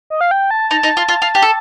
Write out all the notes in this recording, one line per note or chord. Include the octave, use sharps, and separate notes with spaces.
D#5
F5
G5
A5
D#4 A5
D#4
F4
F4
F4
G4
A4